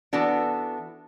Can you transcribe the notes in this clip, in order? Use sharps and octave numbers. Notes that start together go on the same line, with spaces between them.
E3 B3 D4 F#4 A4